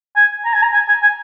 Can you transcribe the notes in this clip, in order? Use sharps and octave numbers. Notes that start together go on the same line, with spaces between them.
G#5
A#5
G#5
A#5
G#5
G#5
G#5